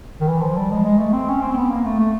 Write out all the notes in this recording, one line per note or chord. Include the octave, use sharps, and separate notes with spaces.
D#3
E3
F3
G3
G#3
G#3
A3
C4
C#4
C4
C4
B3
A#3
A3
A3